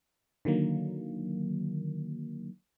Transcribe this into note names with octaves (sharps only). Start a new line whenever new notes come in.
D3 D#3 F#3 A#3